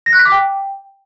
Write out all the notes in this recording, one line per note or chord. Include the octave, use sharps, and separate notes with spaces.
A#6
F#6
B6
D6
G5